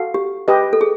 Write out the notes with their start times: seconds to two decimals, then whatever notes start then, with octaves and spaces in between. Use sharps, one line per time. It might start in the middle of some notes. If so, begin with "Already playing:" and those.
Already playing: F#4 A4 F5
0.14 G4
0.48 G4 B4 D#5
0.73 A4
0.81 G#4